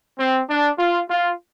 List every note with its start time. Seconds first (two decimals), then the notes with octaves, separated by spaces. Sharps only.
0.18 C4
0.49 D4
0.79 F4
1.09 F4